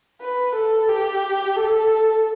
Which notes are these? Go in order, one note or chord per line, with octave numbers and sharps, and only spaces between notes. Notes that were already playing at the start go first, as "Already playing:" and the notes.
B4
A4
G4
A4